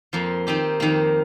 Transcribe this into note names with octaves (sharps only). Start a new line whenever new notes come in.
F2 F3 A#3
D#3 C4 D#4 G4
F2 D#3 A#3